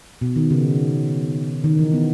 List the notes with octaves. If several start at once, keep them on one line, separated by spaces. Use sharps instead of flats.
B2
D#3
C#3
D#3
E3
B3